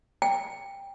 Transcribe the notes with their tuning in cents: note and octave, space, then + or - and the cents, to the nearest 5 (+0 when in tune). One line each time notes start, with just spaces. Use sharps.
G5 +10